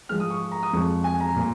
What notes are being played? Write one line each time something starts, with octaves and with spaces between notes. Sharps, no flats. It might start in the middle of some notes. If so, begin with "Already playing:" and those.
G#2 F3 G#3 F6
D#6
C#6
A#5
D#6
F2 F3 G#3 C#6
G#5
A#5
A#2